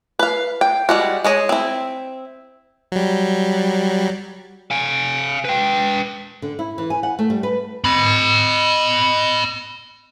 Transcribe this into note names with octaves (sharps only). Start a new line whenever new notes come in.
B4 F5
G5
G3 G#3 F#4
G#3 C#5 D#5
C4 E4
F#3 G3
F5 G#5
B4 G5
D3
E4
E3
G#5
F#5
A3
G3
B4
D#5 B5